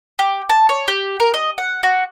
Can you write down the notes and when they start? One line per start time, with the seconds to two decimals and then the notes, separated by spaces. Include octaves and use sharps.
0.19 G4
0.50 A5
0.69 C#5
0.88 G4
1.20 A#4
1.34 D#5
1.58 F#5
1.83 F#4